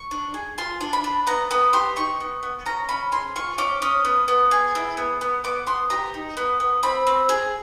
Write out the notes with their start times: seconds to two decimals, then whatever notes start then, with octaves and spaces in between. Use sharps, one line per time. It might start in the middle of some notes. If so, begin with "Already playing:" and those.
Already playing: C#6
0.11 D4
0.34 G#4
0.58 F4 C6
0.81 D4
0.93 B5
1.04 D4
1.27 B3 A#5
1.51 B3 B5
1.73 G4 C6
1.96 D#4 C#6
2.20 B3
2.43 B3
2.66 C#4 A#5
2.89 C#4 B5
3.12 G#4 C6
3.36 F4 C#6
3.58 C#4 D6
3.82 C#4 D#6
4.05 B3
4.28 B3
4.51 G#4
4.75 E4
4.97 B3
5.21 B3
5.44 B3 D6
5.67 B3 C6
5.90 G4 A#5
6.14 D#4
6.37 B3
6.60 B3
6.83 C4 B5
7.07 C4
7.29 G#4